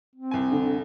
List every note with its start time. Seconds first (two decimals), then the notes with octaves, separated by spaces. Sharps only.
0.15 C4
0.31 C2 G#5
0.52 D3